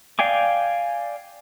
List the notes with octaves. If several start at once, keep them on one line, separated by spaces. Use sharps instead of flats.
D5 F5 G5 G#5 D6